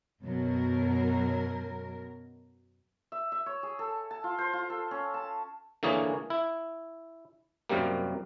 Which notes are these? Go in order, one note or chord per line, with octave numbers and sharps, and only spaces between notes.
F#2 B2 F#3 A#4
E5
E5
C#5
G#4
A4
A5
F4
C5
F4
A4
C#4
A5
D3 E3 A#3 G#4 C#5
E4
F#2 C3 G3 A#3